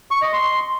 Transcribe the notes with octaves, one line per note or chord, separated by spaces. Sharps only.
C#6
D#5
C6